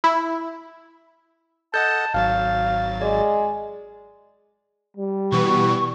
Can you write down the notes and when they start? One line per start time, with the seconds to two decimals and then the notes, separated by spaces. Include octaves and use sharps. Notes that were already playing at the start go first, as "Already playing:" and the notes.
0.04 E4
1.74 A4 D#5 F#5 A5 G6
2.14 G#1 F#3 F5 A6
3.02 G#3 D5
4.97 G3
5.32 B2 E3 B3 C#6